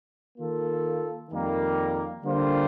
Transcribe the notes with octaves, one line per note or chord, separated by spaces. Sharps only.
D#3 A#3 F4 A4
F2 D#3 G3 A#3
D3 G3 A#3 F4 C5